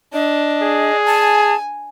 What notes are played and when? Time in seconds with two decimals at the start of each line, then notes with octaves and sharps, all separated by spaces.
0.13 D4 D#5
0.62 G#4
1.06 G#5 A5